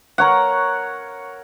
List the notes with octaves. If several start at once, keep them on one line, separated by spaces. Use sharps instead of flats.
A#4 C#5 F#5